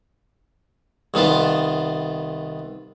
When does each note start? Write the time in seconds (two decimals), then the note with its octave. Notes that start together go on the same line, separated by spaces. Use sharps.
1.14 C2 D#3 B3 F4 A5